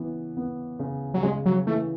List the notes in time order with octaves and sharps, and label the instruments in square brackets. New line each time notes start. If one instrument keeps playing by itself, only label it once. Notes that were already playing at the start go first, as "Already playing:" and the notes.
Already playing: [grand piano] C#3 E3 B3
B3
C#3
[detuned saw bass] F#3
[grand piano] C#3 [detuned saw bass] G#3
[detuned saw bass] F#3
[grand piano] E3 [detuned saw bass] A3